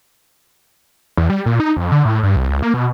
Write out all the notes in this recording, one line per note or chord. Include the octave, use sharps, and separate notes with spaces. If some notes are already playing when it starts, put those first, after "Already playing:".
E2
G3
A#2
D#4
F2
D3
A2
G2
C2
C#2
A#3
B2